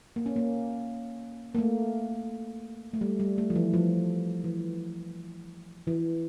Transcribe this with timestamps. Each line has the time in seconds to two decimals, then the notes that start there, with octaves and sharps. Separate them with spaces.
0.16 A#3
0.26 C#4
0.36 A#3
1.55 A#3
1.59 A3
2.94 A3
3.01 G3
3.20 G3
3.38 A3
3.50 F3
3.55 E3
3.74 F3
4.44 E3
5.87 E3